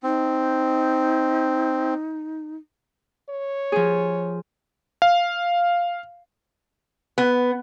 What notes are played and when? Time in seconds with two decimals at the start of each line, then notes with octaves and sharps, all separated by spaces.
0.03 C4 D#4
3.30 C#5
3.72 F3 G#4
5.02 F5
7.18 B3